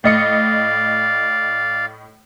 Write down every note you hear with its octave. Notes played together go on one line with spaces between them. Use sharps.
A2 D5 D#5 F5 C#7